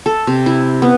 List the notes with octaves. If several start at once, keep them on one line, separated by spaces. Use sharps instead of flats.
A4
C3
E4
B3